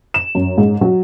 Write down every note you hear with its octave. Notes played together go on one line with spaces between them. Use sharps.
E7
F#2
G#2
F#3